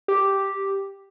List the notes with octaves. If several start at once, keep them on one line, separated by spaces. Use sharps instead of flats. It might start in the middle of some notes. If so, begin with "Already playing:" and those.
G4